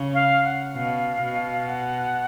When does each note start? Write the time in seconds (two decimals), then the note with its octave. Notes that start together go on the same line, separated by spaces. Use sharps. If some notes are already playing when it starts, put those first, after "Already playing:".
Already playing: C#3
0.14 F5
0.45 F#5
0.75 B2 F5
1.22 B2
1.67 F#5